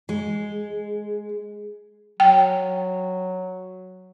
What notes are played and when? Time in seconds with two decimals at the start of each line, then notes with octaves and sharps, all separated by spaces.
0.09 G#3
2.20 F#3 G5